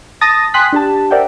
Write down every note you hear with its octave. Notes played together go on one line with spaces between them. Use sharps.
A5 D#6 A6 A#6
G5 G#5 C6 D#6 F#6 B6
D4 G4 A5
A#4 C5 D5 E5 F#5 G5